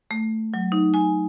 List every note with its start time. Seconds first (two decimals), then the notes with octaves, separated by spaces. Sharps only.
0.11 A3
0.54 F#3
0.72 D#4
0.94 G#5